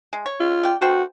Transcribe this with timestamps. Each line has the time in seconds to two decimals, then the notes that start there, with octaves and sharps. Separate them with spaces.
0.13 G#3
0.26 C#5
0.40 F4
0.63 D5 G5
0.82 B2 F#4 C5 G5